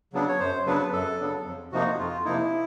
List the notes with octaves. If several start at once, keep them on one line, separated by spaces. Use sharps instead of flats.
C#3 F#3 B3 D4
C#5
F#2 C5
C#3 F#3 B3 D4 B4
F#2 A4
C#3 F#3 B3 D4
F2
C3 F3 A#3 D#4 F#4
F2 F4
C3 F3 A#3 D#4 E4